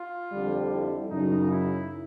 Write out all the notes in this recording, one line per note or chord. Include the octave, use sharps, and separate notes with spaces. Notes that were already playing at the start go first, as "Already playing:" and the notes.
Already playing: F4
F2 D3 G3
E4
F#2 C#3 F#3 D#4
E4